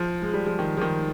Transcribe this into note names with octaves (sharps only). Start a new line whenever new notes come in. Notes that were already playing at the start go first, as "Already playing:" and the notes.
Already playing: F3
G#3
G3
F3
D#3
F3
D#3